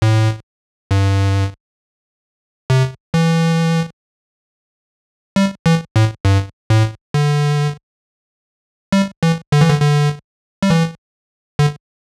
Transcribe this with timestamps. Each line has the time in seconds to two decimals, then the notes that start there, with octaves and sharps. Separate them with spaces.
0.02 A2
0.91 G2
2.70 C3
3.14 E3
5.36 G3
5.66 E3
5.96 A2
6.25 G2
6.70 A2
7.14 D3
8.92 G3
9.23 E3
9.52 D3
9.61 E3
9.70 D3
9.82 D3
10.63 G3
10.70 E3
11.59 D3